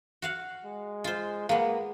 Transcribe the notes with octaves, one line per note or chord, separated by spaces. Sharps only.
F#4 F5 F#5
G#3
F4 C5
G#3 A#3 B3 F5